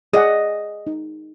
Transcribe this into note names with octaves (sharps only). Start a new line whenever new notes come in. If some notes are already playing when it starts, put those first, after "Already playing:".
G#4 D5 D#5 F#5
D#4